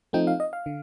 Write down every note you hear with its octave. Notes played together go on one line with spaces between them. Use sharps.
F3 A3 C4 D#4 G5
F5
D#5
F5
D3